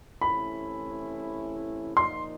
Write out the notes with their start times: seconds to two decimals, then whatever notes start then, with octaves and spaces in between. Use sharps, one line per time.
0.21 C3 E3 A3 C#4 E4 B5
1.96 A#2 F3 A#3 D#4 C6